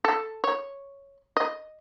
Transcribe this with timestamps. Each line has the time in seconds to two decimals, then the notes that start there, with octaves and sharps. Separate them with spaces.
0.05 A4
0.44 C#5
1.37 D#5